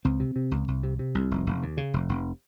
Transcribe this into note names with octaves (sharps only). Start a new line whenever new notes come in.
C#2 C4
C3
C3
C#2
C2
C3
C3
C2
F1
F1
D#2
C#3
F1
F1